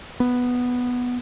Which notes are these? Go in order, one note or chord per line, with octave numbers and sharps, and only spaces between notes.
B3